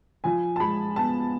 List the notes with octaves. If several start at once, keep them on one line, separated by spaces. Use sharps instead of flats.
F3 G#5
A5
G#3 B5
B3 A5